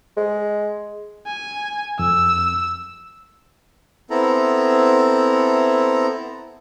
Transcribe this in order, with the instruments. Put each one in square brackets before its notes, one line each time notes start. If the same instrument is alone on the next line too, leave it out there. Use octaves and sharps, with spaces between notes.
[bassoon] G#3
[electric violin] G#5
[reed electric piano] F2 [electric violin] E6
[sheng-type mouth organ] B3 C4 E4 A4 A#5